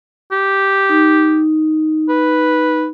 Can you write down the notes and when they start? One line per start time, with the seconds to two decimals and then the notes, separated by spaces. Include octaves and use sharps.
0.32 G4
0.89 D#4
2.09 B4